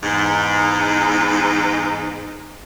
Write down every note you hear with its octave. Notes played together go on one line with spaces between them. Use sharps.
E2 G#2